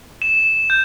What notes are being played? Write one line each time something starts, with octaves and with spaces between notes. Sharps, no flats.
E7
G6